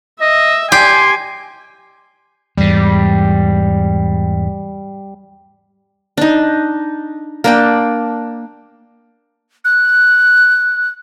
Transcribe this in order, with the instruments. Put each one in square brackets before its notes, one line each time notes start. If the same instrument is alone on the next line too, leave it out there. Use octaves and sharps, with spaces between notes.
[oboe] D#5 [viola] E5
[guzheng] G4 [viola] G#5 [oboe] C6
[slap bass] E2 G#2 [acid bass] G3
[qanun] D4 D#4
A#3 D4 G5
[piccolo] F#6